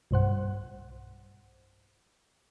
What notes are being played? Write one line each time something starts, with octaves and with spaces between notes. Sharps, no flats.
B1 G2 C5 F#5